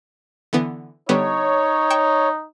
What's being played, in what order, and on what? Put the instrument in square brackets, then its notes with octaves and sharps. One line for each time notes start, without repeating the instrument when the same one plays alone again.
[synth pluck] D3 E3 B3
[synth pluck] D3 G3 B3 [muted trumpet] D#4 [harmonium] C#5
[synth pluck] G5 C#6 E7